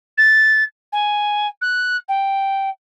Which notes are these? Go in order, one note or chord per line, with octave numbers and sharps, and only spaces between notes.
A6
G#5
F#6
G5